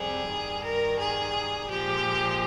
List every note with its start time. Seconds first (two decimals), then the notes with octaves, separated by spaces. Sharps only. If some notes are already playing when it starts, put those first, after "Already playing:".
Already playing: F2 C3 G3 G#4
0.29 G2 D#3 G3
0.63 A#4
0.99 G#4
1.70 A#2 F3 G#3 G4